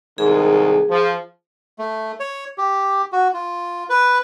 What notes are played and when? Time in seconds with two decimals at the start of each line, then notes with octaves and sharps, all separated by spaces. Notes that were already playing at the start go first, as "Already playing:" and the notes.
0.18 C2 G#2 D#3 G#4
0.90 F3
1.79 A3
2.20 C#5
2.58 G4
3.12 F#4
3.34 F4
3.89 B4